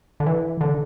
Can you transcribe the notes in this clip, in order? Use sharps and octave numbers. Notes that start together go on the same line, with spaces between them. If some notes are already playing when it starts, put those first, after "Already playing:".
D3
E3
D3